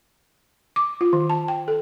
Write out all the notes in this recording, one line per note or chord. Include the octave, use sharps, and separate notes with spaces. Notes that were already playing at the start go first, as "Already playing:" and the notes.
D6
F4
D#3
A5
G5
A4